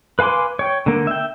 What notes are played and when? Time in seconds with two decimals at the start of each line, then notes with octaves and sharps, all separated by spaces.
0.19 B4 F5 G#5 C6 D6
0.59 C#5 G5
0.86 D3 A#3
1.07 E5 G5